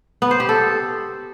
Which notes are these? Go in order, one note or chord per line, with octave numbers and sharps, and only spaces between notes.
B3
C5
G4
A4